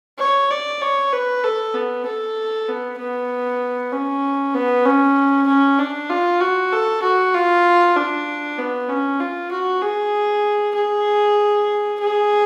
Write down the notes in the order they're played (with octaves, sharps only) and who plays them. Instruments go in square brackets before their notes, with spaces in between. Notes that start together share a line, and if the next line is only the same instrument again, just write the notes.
[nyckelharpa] C#5
D5
C#5
B4
A4
B3
A4
B3
B3
C#4
B3
C#4
C#4
D4
F4
F#4
A4
F#4
F4
D4
B3
C#4
F4
F#4
G#4
G#4
G#4